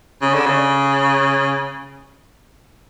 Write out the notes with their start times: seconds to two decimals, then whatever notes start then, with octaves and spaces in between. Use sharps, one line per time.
0.22 C#3
0.34 D3
0.46 C#3